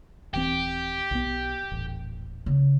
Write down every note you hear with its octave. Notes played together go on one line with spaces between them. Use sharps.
D#1 E3 C4 G4
B1 B2 B3
D#1 A1
C#3